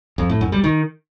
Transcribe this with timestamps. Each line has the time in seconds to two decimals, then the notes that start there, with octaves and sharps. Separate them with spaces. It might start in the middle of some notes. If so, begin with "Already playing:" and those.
0.18 F2
0.29 A2
0.41 F#2
0.52 G3
0.64 D#3